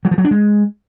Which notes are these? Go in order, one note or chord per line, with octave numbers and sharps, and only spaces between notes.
F#3
F3
F#3
D4
G#3